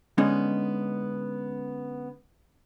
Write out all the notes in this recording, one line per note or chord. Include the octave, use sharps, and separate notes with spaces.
D3 G#3 B3 C#4 D#4